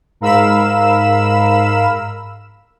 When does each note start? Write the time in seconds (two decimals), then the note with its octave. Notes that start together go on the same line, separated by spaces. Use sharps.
0.20 G#2 A#4 F5 B5 E6 E7